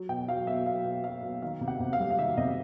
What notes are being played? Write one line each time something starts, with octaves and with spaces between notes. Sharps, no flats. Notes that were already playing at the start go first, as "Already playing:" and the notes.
Already playing: F#3
B2 G5
F#3 F5
B2 E5
F#3 F5
B2
F#3 F5
B2
D#3 F5
C3
F#5
C3
F5
G3
F5
D#3 E5
C3 D#5